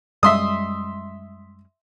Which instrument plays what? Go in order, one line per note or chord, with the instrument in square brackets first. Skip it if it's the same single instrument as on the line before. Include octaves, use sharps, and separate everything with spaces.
[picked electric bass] F#2 G3 G#3 [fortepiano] E5 C6 D#6